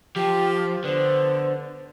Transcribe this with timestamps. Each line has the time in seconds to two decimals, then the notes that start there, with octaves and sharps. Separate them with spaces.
0.16 F3 G4 G5
0.84 D3 B3 C5